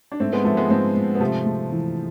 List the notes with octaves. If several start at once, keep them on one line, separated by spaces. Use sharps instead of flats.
D4
G#2 A3 C4
G#3 B3
G#2 F3 A3
G#3 B3
G#2 A3 C4
G#2
B3
C3 F3 A3
G#3
E3